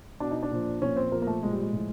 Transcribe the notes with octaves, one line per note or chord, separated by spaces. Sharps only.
B2 D4
D#4
D4
A#2 F3
A#2 F3 C#4
C4
A#2 F3 A#3
A#3
A3
A#2 F3 G#3
G3
G#3
A2 F3